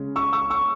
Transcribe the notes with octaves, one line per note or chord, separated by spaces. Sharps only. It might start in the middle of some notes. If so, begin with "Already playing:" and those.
Already playing: C#3 G#3 C#4
C#6 E6
C#6 E6
C#6 E6